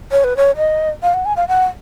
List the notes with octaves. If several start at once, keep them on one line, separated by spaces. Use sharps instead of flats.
C#5
B4
C#5
D#5
F5
F#5
G#5
F5
F#5